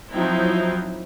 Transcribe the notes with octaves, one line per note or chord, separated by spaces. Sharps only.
F3 F#3 C4 D#4 E4